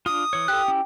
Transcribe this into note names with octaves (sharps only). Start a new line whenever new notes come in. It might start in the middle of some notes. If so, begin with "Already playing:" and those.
D4 F4 D#6
E3 C#5
G4 A4 F#6
C#4 E4